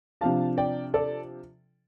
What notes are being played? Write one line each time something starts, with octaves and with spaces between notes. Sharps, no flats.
C3 F3 D4 F5 A5
D5 G5
A4 D5